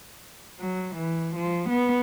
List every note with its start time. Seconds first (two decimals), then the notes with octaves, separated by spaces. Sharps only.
0.60 F#3
0.95 E3
1.36 F3
1.69 B3